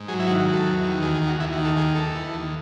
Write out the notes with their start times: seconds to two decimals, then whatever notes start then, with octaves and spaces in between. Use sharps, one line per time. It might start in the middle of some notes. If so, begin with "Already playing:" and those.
Already playing: G#2
0.08 F#3 G#4
0.20 E4
0.27 D#3 F#4
0.41 F#4
0.46 F#3
0.53 A4
0.66 E2
0.84 D#3
1.02 D#2 G#4
1.15 G#4
1.22 D#2
1.27 F#4
1.40 D#2 E4
1.52 F#4
1.58 D#3
1.65 A4
1.76 D#2 G#4
1.95 D#2 A4
2.15 E3
2.34 D#2